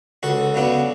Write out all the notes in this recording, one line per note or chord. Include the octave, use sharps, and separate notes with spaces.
C#2 F#4 A4
C#3 F#3 B3 D4